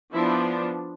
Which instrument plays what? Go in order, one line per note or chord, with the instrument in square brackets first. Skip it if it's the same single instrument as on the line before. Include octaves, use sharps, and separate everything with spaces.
[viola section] F3 B3 D4 E4